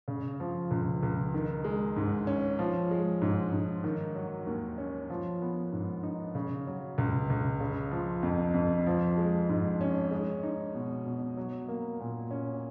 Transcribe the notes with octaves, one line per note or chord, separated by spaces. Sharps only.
C#3
F3
C#2
C#2
D#3
G#3
G#2
C#4
F3
G#3
G#2
G#2
D#3
F#3
D#2
C#4
F3
B3
G#2
D#4
C#3
F#3
C#2
C#2
C#3
F3
F2
F2
F3
G#3
G#2
C#4
G#3
D#4
B2
B2
F#3
A#3
A#2
C#4